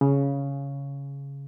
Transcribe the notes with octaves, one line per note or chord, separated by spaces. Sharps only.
C#3